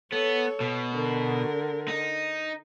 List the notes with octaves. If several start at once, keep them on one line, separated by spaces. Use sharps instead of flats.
B3 A4 C#5
B2
D3 A#4
D#4